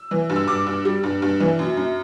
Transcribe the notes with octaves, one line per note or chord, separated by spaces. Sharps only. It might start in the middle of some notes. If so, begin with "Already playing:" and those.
Already playing: E6
E3
G2
E6
G2 D6
G2
G3
G2
G2
E3
F#2
F#2